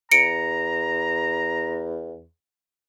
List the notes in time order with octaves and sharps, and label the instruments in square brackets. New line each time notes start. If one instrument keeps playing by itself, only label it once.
[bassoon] E2 [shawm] A#5 [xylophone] C#7 D7